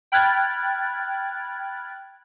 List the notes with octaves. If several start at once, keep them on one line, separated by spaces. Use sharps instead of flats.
G5 B5 F6 F#6 G#6 A6